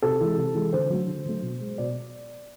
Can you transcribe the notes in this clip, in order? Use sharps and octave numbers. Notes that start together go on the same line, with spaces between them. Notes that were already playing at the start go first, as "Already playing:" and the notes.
C3 A4
E3 G#3
C3
E3 G#3
D3 C5
F#3 A3
D3
F#3 A3
B2
G#3
B2 D5